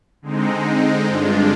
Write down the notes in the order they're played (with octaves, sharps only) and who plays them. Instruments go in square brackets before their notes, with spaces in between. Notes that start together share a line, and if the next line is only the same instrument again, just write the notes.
[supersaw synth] D3 G#3 C4 D#4
G2 D3 G#3 D4 F4